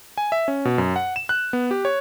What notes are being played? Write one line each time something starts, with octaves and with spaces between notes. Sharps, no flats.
G#5
E5
C#4
B2
F#2
F#5
E7
F#6
B3
G4
C#5